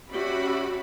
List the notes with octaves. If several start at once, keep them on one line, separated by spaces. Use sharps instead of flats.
C#4 F#4 G4 D5 E5 B5